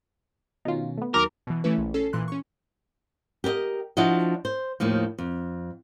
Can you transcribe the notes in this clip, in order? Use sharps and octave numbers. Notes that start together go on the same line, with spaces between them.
B2 D#3 C#4 D#4 F4
A3 B3
D#2 D#3 F#3 A#4 D6
B2 E3
E3 A3 C#4 E4 B4
A#1
C#4 A4 C7
A#2 E3 C6 F#6
C#4 C#6
G4 A#4 C5 D#5
F3 D4 E4 F#4 D#5
C5
D#2 A2 D#3 F3
F2